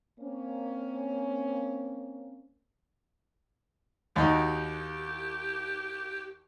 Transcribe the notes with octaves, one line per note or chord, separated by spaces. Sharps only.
A#3 C4 C#4
D#2 D#4 F#4 G4